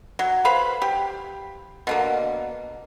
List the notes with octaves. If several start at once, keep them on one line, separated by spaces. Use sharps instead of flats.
F#3
B4 C5 F5 B5
G4
B2 D3 A#3